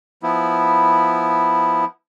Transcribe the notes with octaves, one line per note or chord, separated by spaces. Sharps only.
F3 B3 E4